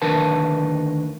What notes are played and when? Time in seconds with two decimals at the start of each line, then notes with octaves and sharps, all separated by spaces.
0.02 D2 D#3 D4 A#4 B4 A5